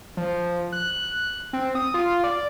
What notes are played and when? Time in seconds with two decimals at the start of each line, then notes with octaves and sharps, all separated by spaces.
0.17 F3
0.72 F#6
1.53 C4
1.75 D#6
1.94 F4
2.24 D5